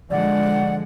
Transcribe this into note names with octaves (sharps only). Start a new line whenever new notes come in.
D3 F3 G#3 D5 F#5